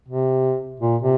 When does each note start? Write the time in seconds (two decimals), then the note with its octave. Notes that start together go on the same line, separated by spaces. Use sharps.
0.09 C3
0.80 A#2
1.02 C3